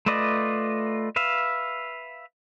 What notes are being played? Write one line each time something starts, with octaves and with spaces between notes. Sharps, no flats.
A3 F4 B4 D5 D#5
B4 E5 F5